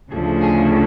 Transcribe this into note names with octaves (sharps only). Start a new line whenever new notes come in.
D2 C#3 F3 A3 G#4
G#4